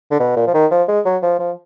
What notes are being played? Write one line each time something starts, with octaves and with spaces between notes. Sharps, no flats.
D3
B2
A#2
F3
D#3
F3
G#3
F#3
F3
F3